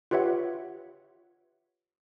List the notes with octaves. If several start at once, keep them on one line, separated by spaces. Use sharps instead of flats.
F4 G4 B4 C#5 E5 F#5